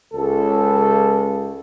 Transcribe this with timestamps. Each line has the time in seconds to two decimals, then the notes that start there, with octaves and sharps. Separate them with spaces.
0.14 C#2 A4